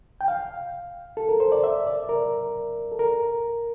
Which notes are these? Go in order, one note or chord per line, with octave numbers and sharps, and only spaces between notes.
G5
F5
A4
A#4
C5
D5
E5
D5
A#4
A4
A#4